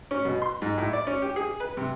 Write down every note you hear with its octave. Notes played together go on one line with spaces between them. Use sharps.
C#4
B2
C6
G#2
A2
D5
C#4
G4
G#4
B4
C3